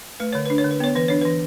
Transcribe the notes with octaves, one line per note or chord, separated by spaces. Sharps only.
A3 B4
D3 C#5
D4 B4
C#5
D3
B4
B3 C#5
E3 B4
D4 C#5
B4
E3